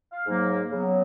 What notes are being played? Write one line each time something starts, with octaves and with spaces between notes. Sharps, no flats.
F5
G#2 F#3 A#3
C#3 F#3 B3